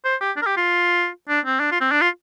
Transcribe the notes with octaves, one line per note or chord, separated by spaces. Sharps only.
C5
G4
D4
A#4
G4
F4
D4
C4
D4
F4
C4
D4
F4